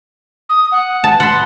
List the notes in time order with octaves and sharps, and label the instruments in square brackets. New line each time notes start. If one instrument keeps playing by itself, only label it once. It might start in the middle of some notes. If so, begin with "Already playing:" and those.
[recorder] D#6
F#5
[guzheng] A5
[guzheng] F#5 B5 [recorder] C6